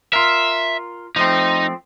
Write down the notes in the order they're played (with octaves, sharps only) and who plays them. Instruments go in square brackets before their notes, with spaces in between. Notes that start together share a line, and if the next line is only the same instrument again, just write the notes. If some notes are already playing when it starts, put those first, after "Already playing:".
[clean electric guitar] F4 A#4 [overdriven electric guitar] E5
[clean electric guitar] F3 A3 C4 [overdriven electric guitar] D#4